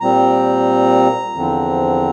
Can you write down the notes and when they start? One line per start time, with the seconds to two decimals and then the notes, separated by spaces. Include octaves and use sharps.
0.01 A#2 G3 C4 A#5
1.35 E2 D3 F3 C4